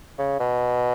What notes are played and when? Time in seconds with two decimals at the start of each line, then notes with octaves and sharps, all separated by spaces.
0.18 C#3
0.40 B2